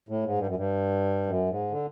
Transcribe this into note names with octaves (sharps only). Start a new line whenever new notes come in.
A2
G#2
G2
F#2
G2
F#2
G#2
D3